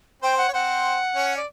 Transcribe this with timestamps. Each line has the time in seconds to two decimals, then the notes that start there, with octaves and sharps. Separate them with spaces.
0.22 C4 C5 G5
0.38 F#5
0.48 C#5
0.53 C4 C5 F#5
1.15 C#4 C#5
1.37 D5